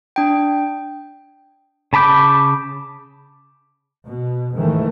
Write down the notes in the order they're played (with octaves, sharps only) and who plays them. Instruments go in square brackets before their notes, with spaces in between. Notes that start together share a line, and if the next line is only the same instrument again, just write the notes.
[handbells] D4 G5
[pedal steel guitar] C#3 A5 B5 D6 G6
[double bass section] B2
G#2 D#3 E3 A3